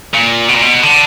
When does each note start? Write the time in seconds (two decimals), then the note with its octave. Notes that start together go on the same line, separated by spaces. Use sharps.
0.14 A#2
0.49 B2
0.55 A#2
0.62 B2
0.83 D3